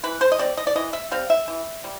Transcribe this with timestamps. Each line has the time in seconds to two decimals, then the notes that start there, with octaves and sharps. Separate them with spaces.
0.03 E3 B4
0.21 C5
0.32 D#5
0.39 G3 C4 D5
0.57 D#5
0.67 D5
0.76 E3 D#5
0.93 E5
1.12 G3 C4 F5
1.30 E5
1.48 E3
1.84 G3